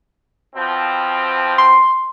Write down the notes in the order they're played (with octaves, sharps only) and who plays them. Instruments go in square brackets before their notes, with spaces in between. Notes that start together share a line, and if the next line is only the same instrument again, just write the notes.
[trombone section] B2 F3 C4
[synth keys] C6